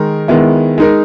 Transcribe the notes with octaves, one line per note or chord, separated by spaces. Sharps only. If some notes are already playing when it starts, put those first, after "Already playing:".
Already playing: D#3 G#3 D#4 A#4
D#3 G#3 B3 E4
G#3 D#4 A#4